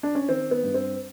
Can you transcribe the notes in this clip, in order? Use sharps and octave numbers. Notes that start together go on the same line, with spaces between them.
D4
C#4
D#3 C4
B3
G2
C4